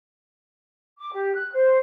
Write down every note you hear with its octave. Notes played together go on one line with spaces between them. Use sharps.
D6
G4
F#6
C5